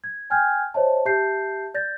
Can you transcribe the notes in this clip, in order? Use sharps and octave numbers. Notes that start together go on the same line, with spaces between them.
G#6
G5 G#5 F6 G6 G#6
C5 C#5 D#5 E5 A5
G4 E5 A5 G6 C7
D5 G6 A6 A#6